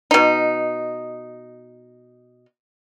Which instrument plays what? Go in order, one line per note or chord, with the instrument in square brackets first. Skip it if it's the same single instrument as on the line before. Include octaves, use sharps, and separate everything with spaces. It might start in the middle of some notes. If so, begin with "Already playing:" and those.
[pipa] B2 D#4